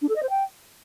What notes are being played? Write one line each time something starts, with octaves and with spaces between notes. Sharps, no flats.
D4
A4
D#5
C5
G5